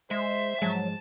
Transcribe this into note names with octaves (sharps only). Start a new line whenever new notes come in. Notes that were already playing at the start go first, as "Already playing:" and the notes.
G#3 C5 E5
G#2 F3 F#3 G#3 A5